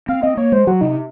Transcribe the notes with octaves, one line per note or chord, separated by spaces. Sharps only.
C4 F5
C4 D#5
A#3 C#5
G#3 C5
F#3 F#4
C3 D#4